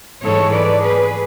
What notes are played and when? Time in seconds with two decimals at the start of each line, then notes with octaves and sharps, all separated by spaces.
0.23 G#2 E3 G#3 A4 C#5
0.52 B4 D5
0.81 G#4 B4